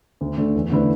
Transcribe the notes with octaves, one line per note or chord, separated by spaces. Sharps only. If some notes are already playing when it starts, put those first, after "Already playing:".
D2
D3 A3
E2
D3 A3 E4 B4